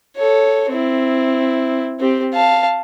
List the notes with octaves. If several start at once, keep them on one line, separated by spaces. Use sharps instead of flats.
A4 C#5
C4 E4
C4 G4
F5 A5